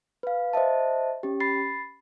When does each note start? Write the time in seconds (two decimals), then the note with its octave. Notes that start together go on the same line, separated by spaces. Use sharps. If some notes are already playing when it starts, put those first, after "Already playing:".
0.23 B4 F5
0.53 C5 D#5 E5 A5
1.23 C#4 G4
1.40 B5 A6 C7